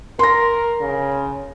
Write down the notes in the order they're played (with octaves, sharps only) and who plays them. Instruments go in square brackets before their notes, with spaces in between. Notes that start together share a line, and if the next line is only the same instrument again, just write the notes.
[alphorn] A#4 [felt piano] C6 A#6
[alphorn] C#3